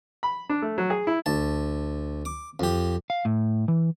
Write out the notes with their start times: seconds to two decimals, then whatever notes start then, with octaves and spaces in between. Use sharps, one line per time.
0.23 B5
0.49 D4
0.62 A3
0.78 F#3
0.90 G#4
1.07 E4
1.26 D2 A5
2.25 D6
2.60 F2 G4
3.10 F5
3.25 A2
3.68 E3